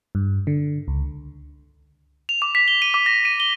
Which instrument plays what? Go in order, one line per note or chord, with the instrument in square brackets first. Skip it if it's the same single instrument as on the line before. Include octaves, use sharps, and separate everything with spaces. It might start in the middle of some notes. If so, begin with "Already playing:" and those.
[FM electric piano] G2
D3
C#2
[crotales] F7
D6
B6
G7
D#7
D6
A#6
D#7
G7